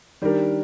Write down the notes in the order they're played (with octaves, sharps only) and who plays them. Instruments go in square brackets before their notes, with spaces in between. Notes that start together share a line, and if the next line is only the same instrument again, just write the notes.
[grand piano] D#3 G3 D4 G4 A#4